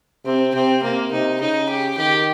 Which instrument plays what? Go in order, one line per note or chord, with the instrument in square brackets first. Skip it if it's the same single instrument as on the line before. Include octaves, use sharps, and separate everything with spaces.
[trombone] C3 [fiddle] C4
[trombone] C3 [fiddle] C4
[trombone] C3 [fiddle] A#3
[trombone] C3 [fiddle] D#4
[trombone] C#3 [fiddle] D#4
[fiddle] G4
[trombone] D#3 [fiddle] G4